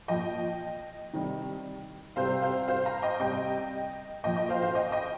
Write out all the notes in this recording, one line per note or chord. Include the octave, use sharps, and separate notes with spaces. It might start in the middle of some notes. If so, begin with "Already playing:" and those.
A#2 F3 D#5 G5
C3 D#3 G3
C3 G3 C5 F5
C5 F5
C5 F5
F5 A#5
D#5 G5
C3 G3 D#5 G5
A#2 F3 D#5 G5
D#5
C5 F5
C5 F5
D#5 G5
D#5 G5